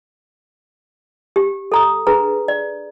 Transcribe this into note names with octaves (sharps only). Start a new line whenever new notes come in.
G4
A4 A#5 D#6
D4 G#4 B4 A#5
D5